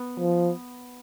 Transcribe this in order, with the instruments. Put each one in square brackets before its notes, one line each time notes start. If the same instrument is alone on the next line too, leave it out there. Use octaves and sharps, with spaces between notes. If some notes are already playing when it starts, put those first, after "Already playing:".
Already playing: [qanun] B3
[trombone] F3